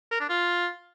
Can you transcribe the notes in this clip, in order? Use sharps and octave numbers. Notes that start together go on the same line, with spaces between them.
A#4
D4
F4